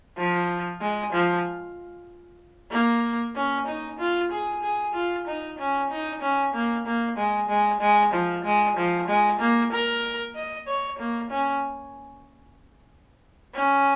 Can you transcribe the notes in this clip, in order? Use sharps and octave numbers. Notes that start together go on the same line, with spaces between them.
F3
G#3
F3
A#3
C#4
D#4
F4
G#4
G#4
F4
D#4
C#4
D#4
C#4
A#3
A#3
G#3
G#3
G#3
F3
G#3
F3
G#3
A#3
A#4
D#5
C#5
A#3
C#4
C#4